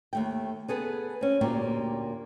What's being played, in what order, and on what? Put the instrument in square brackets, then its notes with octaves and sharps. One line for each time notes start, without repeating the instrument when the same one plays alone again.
[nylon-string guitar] D#2 A3 G5
B3 G#4 A4 B4
C4 C#4
D2 A#2 A#3 G4 C#5 G5